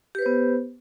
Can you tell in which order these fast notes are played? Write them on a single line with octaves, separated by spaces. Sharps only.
G4 B4 C5 B3